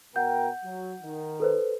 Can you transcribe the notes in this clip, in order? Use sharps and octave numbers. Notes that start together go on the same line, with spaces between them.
B2 A#4 F#5 G5 G6
F#3
D#3
A4 B4 C5